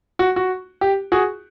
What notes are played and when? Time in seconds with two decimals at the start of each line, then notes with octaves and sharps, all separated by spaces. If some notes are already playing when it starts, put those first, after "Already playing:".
0.19 F#4
0.36 F#4
0.81 G4
1.12 F#4 G#4